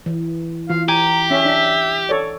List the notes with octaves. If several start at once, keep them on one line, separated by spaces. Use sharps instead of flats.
E3
E3 F4 F5
G4 G#5 A#5
C#4 E5
D4
A4 C#5 D5